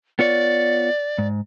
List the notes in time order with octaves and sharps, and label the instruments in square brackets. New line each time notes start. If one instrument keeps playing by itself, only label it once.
[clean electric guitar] B3 F4 C#5 [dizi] D5
[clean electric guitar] G#2